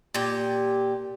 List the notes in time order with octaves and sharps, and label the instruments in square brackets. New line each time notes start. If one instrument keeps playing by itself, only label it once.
[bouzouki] A#2 G4